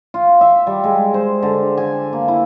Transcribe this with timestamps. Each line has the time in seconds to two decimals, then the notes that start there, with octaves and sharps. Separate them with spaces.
0.14 F4
0.41 E5
0.67 G3
0.84 G#3
1.14 C5
1.43 D3
1.78 G#5
2.13 A#3
2.28 E4